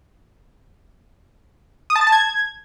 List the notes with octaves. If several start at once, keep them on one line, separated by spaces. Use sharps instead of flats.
D#6
A5
A6
A5
G#6